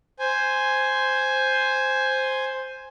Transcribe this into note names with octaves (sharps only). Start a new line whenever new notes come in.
C5 G#5